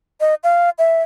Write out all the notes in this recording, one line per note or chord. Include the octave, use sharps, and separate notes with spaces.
D#5
F5
E5